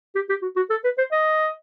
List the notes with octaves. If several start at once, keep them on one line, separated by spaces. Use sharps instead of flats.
G4
G4
F#4
F#4
A4
B4
C5
D#5